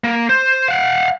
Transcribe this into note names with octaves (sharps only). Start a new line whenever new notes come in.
A#3
C5
F5 F#5